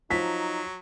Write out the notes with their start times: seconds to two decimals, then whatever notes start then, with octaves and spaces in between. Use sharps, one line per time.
0.11 F3 F#3 D#4 B6